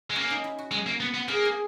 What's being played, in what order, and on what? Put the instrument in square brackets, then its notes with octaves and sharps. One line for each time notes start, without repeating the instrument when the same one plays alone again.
[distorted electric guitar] G#3
[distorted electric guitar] A#3 [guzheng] C#4
[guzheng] D#4
E4
F#4
[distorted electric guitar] G#3 [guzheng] F#4
[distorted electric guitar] A#3
B3
B3
[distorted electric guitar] A#3 [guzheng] G#4
[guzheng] G#4